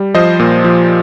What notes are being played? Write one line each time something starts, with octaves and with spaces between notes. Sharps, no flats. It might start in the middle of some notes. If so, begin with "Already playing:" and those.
Already playing: G3
F3 C5 D#5
A#2
F3